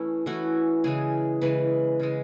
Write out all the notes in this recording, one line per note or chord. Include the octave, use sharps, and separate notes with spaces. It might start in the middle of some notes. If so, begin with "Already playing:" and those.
Already playing: E3 A3 C#4 E4
E3 A3 C#4 E4 F#4
C#3 E3 G#3 G#4
C#3 E3 G#3 B4
C#3 E3 G#3